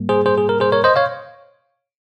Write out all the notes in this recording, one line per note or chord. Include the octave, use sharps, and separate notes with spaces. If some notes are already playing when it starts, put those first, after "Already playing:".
Already playing: G#2 G3 A#3
G#4 C5
G#4 C5
G#4
A#4
G#4 C5
A#4 C#5
C5 D#5
C#5 F5